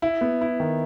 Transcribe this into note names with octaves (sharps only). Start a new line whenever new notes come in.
E4
B3
E4
D#3